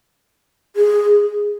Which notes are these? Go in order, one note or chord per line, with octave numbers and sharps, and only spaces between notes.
G#4